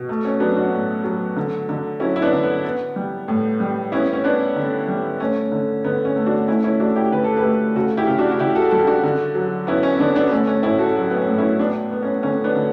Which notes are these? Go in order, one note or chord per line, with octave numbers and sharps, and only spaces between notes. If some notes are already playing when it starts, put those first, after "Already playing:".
Already playing: B2
A3
C#4
F#3 B3 D4
D4 F#4
A2
F#3
D3
D3
F#3 C#4 E4
E4
B3 D4
D3
B3
B3
G3
A2
G3
B3 C#4 E4
C#4
B3 D4
D3
G3
A3 C#4
D3
D3 B3
C#4
A3
D4 F#4
A3 C#4 E4
C#4 E4
A3 D4 F#4
E4 G4
D3 B4
A4
G4 B4
A3
C#3 F#4 A4
E4 G4
C#3
D4 F#4
F#4
C#3 E4 G4
F#4 A4
G3 F#4 A4
D4 F#4
D3
F#3
B3 C#4 E4
C#4
D3 B3 D4
B3 D4
B3
A3 C#4
C#4
A2 C#4 E4
F#4 A4
F#3
B3
C#4
A2
C#4 E4
B3 D4
B3
C#4
D3 C#4
B3 D4
D3